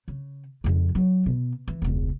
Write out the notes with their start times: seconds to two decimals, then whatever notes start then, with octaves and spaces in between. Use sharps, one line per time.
0.08 C#3
0.64 F2 C#3
0.95 F#3
1.26 B2
1.68 E3
1.82 E1 C#2